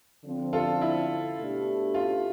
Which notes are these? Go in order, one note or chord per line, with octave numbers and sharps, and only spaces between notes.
D3 F3 C4
F4 A4
E4
B2 A3 D4 G4
F4